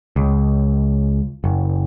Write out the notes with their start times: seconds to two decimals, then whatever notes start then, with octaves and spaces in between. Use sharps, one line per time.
0.16 C#2
1.44 F#1